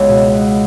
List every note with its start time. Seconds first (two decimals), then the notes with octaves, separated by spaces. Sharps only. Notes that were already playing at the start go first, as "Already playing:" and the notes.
Already playing: C#2 G#3 B3
0.09 B2
0.33 B3